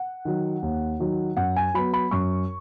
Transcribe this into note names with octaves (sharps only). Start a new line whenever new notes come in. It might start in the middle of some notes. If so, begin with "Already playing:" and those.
Already playing: F#5
D#3 F#3
D#2
D#3 F#3
F#2 F#5
G#5
F#3 B3 B5
B5
F#2 C#6